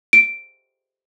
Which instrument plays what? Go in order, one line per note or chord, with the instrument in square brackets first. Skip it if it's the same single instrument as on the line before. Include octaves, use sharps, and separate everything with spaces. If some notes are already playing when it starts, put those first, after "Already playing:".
[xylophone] D7